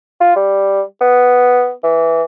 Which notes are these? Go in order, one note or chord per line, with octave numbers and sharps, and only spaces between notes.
F4
G3
B3
E3